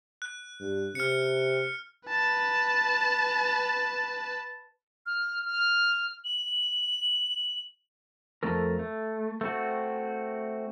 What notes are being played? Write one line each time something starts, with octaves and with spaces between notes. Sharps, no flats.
F#6
G2
C3 F6 C#7
B4 A5
F6
F6
F#7
F2 A3 A4 A#4
A3
A3 C4 F#4